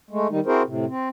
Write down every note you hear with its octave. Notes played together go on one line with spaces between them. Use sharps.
G#3 A3
D#3 G3 D#4
C4 E4 F#4 G#4 A#4 C5
A2 C3
C4